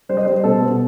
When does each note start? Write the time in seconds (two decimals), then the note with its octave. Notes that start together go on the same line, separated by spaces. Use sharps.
0.09 G3 C5
0.17 D#5
0.25 G3 C5
0.44 B2 A4
0.61 B2